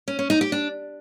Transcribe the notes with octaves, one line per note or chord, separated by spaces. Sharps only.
C#4
C#4
D#4
G4
D4